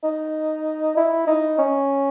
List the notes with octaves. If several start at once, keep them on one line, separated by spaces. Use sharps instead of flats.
D#4
E4
D#4
C#4